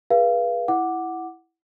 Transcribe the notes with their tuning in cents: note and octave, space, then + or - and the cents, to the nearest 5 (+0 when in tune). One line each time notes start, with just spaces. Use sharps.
G#4 +0 B4 -30 F5 -25
E4 +0 F#5 +0 D6 +0